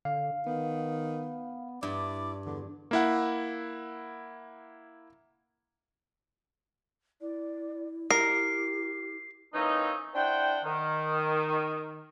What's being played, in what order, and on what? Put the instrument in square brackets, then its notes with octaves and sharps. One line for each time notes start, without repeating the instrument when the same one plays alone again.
[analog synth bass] D3 [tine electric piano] F5
[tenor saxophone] D#3 [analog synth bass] B3
[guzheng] G2 [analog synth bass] E4 [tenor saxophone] D5
[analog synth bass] E2 [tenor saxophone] D3
[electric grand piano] A#3 E4 F#5
[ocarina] E4 [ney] D5
[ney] G4 [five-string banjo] A#4 [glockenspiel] C7
[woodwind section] E3 A#3 C4 C#4 D#4
D4 E4 C5 F#5 G5
D#3